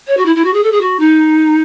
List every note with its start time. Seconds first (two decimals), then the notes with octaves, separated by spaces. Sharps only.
0.07 C#5
0.17 F#4
0.25 E4
0.35 E4
0.44 F#4
0.53 G#4
0.63 A4
0.71 G#4
0.80 F#4
0.99 D#4